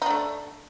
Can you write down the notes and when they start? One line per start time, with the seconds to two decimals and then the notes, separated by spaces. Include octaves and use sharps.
0.02 D#4
0.06 D4
0.10 A3